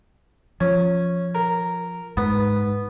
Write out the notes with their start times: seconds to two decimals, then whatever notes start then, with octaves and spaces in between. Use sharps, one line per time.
0.61 F3 C#4
1.35 A#4
2.17 G#2 B3